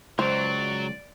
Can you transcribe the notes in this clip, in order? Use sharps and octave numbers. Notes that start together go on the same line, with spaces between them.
C#2 F#3 C5 D5